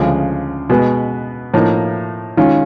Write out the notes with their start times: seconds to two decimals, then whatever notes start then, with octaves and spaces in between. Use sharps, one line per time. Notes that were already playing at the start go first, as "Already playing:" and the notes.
Already playing: D2 C#3 F3 G#3
0.70 B2 G#3 B3
1.54 A2 F3 A#3 D#4
2.37 D#3 G#3 C#4 F4